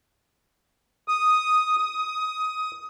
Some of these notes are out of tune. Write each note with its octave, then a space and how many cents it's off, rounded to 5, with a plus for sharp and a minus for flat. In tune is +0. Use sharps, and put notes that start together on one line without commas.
D#6 +0
D#6 +15